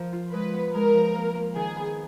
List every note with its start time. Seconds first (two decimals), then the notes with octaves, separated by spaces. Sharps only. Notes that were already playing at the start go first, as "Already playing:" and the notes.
Already playing: F3 A#4
0.13 F4
0.33 G#3 B4
0.53 B3
0.74 G#3 A#4
0.94 F3
1.15 A#3
1.35 A#3
1.55 D#3 G#4
1.76 B3